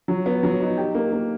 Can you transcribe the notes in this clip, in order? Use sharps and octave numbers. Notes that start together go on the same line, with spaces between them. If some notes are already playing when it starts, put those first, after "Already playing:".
F#3
B3
F#3
D#4
G4
A#3
A#3